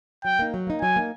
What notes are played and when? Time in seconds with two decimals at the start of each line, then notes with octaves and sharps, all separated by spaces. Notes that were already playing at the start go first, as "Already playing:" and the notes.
0.25 F#3 G5
0.39 A#3 D#4
0.54 F#3
0.67 A#3 D#4
0.82 F#3 G#5
0.96 A#3 D#4